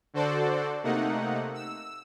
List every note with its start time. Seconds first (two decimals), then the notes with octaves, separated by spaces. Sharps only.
0.14 D3 F#4 A4 C5 D5
0.83 C3 A3 A#3 D#4 F#5
1.54 E6